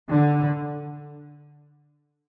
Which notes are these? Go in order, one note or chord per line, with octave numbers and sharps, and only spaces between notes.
D3